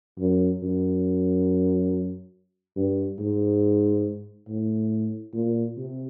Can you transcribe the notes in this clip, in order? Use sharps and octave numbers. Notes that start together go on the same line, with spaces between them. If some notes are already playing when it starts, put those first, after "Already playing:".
F#2
F#2
G2
G#2
A2
A#2
C3